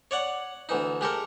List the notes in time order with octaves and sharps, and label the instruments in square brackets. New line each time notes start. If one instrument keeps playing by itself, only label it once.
[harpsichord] C#5 D5 F#5
D2 E3 D#4
G#3 G4 A4 A#4